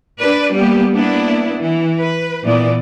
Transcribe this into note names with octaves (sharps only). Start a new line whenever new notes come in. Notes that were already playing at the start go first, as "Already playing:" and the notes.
D4 B4 D5
G3 A#3 B3 G4
A#3 B3 D4 E4
E3
B4
A#2 E3 B3 D5